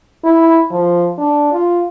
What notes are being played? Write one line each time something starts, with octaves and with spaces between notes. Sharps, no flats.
E4
F3
D4
F4